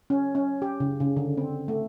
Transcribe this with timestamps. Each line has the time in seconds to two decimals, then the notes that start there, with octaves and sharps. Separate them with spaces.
0.10 C#4
0.35 C#4
0.62 G4
0.80 C#3
1.00 C#3
1.17 D3
1.37 C4
1.68 A3